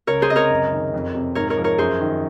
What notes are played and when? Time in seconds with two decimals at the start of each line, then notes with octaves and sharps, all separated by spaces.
0.07 C#2 A#4 C#5
0.22 G#4 C5
0.30 C3 D#5
0.36 A#4 C#5
0.50 F#2
0.72 D#3
0.94 F2
1.15 C3
1.35 G#2 A#4 C#5
1.50 A#4 C#5
1.57 F3
1.64 A#4 C#5
1.78 F#2 G#4 C5
2.00 D#3